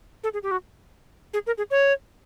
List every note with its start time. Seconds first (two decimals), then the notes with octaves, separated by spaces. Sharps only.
0.24 A4
0.33 G#4
0.43 G4
0.51 F#4
1.34 G#4
1.47 A#4
1.58 G#4
1.71 C#5